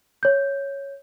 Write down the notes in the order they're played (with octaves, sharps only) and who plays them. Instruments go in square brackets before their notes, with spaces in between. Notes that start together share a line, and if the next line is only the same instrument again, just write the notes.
[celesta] C#5 G6